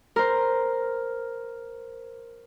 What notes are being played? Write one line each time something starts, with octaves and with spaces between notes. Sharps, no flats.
A#4 C5